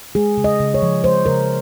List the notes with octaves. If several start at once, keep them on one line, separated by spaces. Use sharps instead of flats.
G#3 G#4
C#3
D#5
C#3
C#5
F3
G#3 C5
C#3 A#4